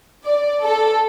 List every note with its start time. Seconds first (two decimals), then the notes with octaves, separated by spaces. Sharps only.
0.24 D5
0.63 A4